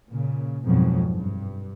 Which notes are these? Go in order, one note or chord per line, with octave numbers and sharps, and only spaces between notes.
A#2 C#3
B1 F2 G#2 B2 F#3
G2